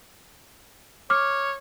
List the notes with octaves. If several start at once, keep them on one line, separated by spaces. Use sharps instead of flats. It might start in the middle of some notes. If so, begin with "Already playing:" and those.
C#5 D6 F6